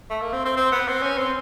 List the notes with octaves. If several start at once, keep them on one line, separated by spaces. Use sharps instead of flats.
A3
A#3
C4
C4
C4
B3
C4
C#4
C4